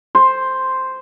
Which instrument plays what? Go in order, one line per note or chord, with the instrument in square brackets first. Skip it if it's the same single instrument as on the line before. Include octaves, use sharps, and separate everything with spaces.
[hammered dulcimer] C5